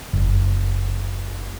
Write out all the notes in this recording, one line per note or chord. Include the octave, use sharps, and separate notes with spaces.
F#1